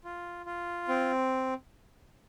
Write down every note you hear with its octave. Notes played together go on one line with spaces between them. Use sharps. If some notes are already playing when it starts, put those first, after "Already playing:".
F4
F4
C4